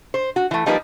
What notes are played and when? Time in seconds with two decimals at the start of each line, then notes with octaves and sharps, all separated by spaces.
0.14 C5
0.36 F#4
0.51 E3 A3
0.66 F3 G3 A#3 D#4 B4 D5